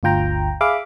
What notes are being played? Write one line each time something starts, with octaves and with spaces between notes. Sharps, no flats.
G1 D2 F4 G5 A#5
G#4 E5 F5 B5 D6